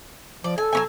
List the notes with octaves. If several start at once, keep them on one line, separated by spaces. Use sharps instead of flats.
F3 D5
A4 G#5
F#3 C#4 G#5